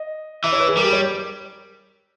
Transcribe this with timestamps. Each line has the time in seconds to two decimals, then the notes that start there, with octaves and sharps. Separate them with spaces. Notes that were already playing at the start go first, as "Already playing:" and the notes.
Already playing: D#5
0.44 E3 E5
0.53 C#5
0.60 B4
0.68 G#4
0.77 G3 A#4
0.84 G4
0.93 C#5